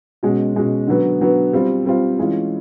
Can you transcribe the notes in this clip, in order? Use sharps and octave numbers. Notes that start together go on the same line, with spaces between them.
B2 G#3 C#4 F#4
B2 G#3 C#4 F#4
D3 F#3 B3
D3 F#3 B3
G3 C4 F4
G3 C4 F4
E3 G#3 C#4 F4